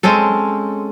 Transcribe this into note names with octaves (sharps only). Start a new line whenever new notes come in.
G#3 C4 C#4 A4